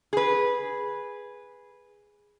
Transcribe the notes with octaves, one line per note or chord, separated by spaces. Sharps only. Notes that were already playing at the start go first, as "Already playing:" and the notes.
G#4 B4